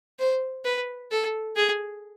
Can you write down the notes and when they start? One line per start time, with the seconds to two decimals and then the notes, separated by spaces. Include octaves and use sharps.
0.19 C5
0.65 B4
1.11 A4
1.56 G#4